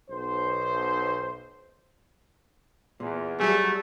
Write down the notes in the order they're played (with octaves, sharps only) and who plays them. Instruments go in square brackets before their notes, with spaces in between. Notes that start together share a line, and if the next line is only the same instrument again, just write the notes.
[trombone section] B1 C5
[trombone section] E2 [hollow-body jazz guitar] A#2
[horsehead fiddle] F#3 G3 [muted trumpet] A3 [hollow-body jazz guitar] G#4